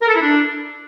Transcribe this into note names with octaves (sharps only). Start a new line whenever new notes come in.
A#4
A4
E4
D4